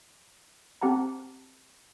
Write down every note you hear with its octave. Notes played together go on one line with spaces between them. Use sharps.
C4 G4 F#5 A5 A#5